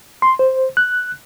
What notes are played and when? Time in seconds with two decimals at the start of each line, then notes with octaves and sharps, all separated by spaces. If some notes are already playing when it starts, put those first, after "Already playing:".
0.22 C6
0.39 C5
0.77 F#6